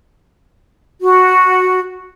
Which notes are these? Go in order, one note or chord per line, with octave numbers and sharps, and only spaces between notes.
F#4